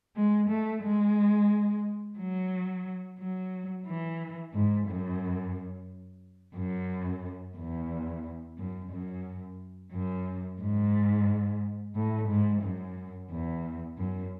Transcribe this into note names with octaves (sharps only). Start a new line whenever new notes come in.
G#3
A3
G#3
F#3
F#3
E3
G#2
F#2
F#2
E2
F#2
F#2
F#2
G#2
A2
G#2
F#2
E2
F#2